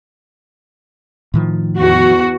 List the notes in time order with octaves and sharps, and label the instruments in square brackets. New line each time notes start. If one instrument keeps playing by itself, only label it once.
[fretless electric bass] A2 D#3 F3
[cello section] E2 F#4